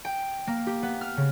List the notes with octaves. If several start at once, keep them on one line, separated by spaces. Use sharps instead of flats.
G5
A#3
G4
B3
F6
C#3